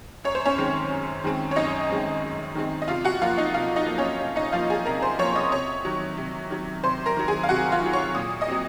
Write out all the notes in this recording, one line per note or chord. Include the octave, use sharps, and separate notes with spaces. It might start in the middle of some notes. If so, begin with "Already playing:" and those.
F#2 C#5
C5
C#4 C#5
D#3 G#3 C4
F#2
D#3 G#3 C4
C#5
F#2 D#4 D#5
D#3 G#3 C4
F#2
D#3 G#3 C4
D#5
C3 F4 F5
F#4 F#5
F3 A#3 F4 F5
D#4 D#5
C3 F4 F5
D#4 D#5
F3 A#3
C#4 C#5
C3
D#4 D#5
F3 A#3 F4 F5
G#4 G#5
C3 A#4 A#5
C5 C6
F3 A#3 C#5 C#6
D#5 D#6
C3 C#5 C#6
D#3 F#3
C3
D#3 F#3
C3 C5 C6
A#4 A#5
D#3 F#3
G#4 G#5
F5
C3 F#4 F#5
F4 F5
D#3 F#3
C#5 C#6
A#2 D#6
D#5 D#6
F#3 C4